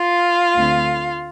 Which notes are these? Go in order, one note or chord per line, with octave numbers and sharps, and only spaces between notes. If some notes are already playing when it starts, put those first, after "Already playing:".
Already playing: F4 F5
D2 D3 A3 C4